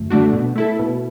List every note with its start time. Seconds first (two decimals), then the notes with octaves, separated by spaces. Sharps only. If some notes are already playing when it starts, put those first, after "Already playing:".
Already playing: F#2 D3 A3
0.10 D3 A3 D4 F#4
0.33 B2
0.56 A3 E4 A4
0.79 B2